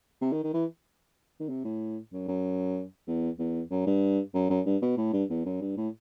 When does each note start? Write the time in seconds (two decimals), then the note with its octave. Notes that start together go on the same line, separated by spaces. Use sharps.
0.22 C3
0.32 D#3
0.44 D#3
0.54 E3
1.40 D#3
1.49 C3
1.64 A2
2.12 F#2
2.28 F#2
3.07 E2
3.39 E2
3.71 F#2
3.87 G2
4.34 F#2
4.50 F#2
4.66 G2
4.82 B2
4.97 A2
5.13 G2
5.30 E2
5.46 F#2
5.61 G2
5.77 A2